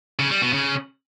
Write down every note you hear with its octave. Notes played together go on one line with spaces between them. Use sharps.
C#3
G3
B2
C#3